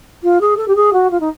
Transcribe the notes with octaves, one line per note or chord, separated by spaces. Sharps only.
F4
G#4
A4
G4
G#4
F#4
F4
D#4